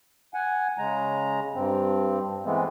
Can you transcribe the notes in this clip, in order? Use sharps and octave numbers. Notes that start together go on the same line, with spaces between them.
F#5 G#5
C#3 G#3 A#5
G2 C4
E3 G#3 A3 B3 C4